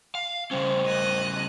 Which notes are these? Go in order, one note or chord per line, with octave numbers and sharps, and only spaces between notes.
F5
C#3 G3 C#4 C5
D#5 F#6